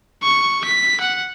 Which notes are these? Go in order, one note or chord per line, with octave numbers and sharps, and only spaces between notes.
C#6
B6
F#5